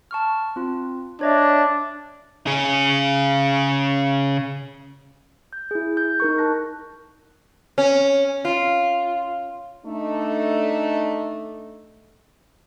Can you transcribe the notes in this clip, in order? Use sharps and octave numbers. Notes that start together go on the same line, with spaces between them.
A5 C#6 F6
C4 F4
D4 C#5 D#5 E5
C#3 G#4
G6
E4 G#4
G6
D#4 A#4 C#6
D#4 A5 F#6 A#6
C#4
F4
A3 D4 D#4